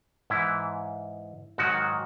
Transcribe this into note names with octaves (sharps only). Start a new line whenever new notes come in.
G#2 E3 E4
G#2 D#3 F#3 F#4